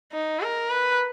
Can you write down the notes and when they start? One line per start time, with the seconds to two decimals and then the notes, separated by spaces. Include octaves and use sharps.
0.13 D#4
0.41 A#4
0.69 B4